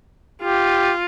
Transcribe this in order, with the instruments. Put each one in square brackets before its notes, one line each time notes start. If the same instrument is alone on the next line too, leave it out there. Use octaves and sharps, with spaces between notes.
[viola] F4 [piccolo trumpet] G4